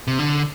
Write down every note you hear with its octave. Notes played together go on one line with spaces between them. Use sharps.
C3
D3